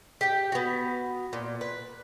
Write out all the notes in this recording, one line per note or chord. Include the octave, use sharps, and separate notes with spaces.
G4 G5
B3 F#4
A#2
B4